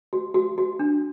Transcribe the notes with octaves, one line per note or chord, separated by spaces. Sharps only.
F#4
F#4
F#4
D4